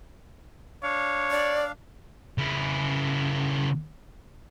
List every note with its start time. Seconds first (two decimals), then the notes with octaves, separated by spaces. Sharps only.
0.83 D4 C#5 F5
1.30 D5
2.38 C#3 E4